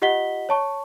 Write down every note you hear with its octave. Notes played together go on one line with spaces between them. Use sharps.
F4 G4 D#5 F#5 B6 G7
C#5 A5 C#6